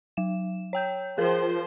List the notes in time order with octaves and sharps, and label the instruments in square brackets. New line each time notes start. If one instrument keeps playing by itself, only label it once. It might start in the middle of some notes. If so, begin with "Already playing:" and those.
[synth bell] F#3 E7
C#5 G5 G6
[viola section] F3 C5 [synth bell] G#4 A#4